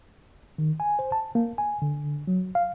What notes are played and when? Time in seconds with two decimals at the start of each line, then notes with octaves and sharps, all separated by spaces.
0.58 D#3
0.80 G#5
0.99 C5
1.12 A5
1.35 A#3
1.58 G#5
1.82 D3
2.27 F#3
2.55 F5